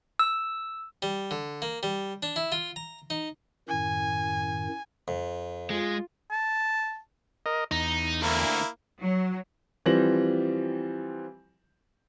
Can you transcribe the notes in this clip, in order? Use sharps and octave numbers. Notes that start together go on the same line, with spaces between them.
E6
G3
D3
A#3
G3
D4
E4
F4
A#5
D#4
F#2 A2 D#3 G#5
F2
G#3 F4
A5
A#4 D#5
E2 D#4
D2 A#3 E4
F#3
E3 F3 G3 C4 A#6 F#7